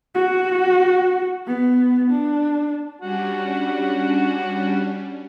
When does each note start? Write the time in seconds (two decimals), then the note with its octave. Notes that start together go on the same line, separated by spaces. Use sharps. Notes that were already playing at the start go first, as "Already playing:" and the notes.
0.15 F#4
1.47 B3
2.11 D4
3.02 G3 C#4 D4 F#4